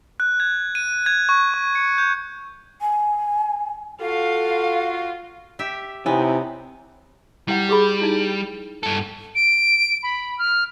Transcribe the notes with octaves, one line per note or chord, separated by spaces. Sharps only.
F#6
G#6
D#7
G#6
C#6
C#6
C#7
G6
G#5
F4 F#4 A4 F5
G4 E5
C3 B3 D#4 E4 C#5 G#5
G3 E4 F#5
G4 G#4 B5
D#4 E4
G2 A4
D7
B5
F6